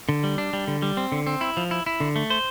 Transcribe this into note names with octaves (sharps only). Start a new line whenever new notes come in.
D3
G3
D4
G3
D3
G3
C4
D3
C4
E4
F3
E4
E4
D3
A3
C5